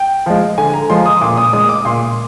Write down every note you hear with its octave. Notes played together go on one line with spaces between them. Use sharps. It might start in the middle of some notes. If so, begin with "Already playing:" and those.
Already playing: G5
F3 G#3
D3 G#5
A#5
F3 G#3 C6
D#6
A#2 D6
D#6
G#3 D#6
D6
A#2 C6